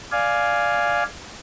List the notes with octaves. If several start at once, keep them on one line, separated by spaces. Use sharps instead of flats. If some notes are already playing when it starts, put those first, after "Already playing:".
D5 F5 G#5